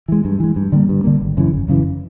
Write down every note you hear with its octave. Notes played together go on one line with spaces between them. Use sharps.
E3 G#3
G2
E3 G#3
G2
D3 G3 A#3
G2
D3 G3 A#3
G#1
F#2 C#3 E3
G#1
F#2 C#3 E3